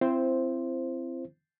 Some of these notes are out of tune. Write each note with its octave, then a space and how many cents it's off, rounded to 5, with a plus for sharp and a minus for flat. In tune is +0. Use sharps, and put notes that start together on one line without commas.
C4 -5 E4 +35 C5 +0